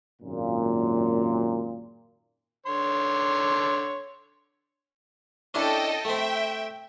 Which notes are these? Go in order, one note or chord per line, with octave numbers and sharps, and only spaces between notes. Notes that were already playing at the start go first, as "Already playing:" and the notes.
G#1 F#2 A#2
D3 C#5 C6
C#4 D4 E4 A4 D#5 G5
A3 C4 E5 G5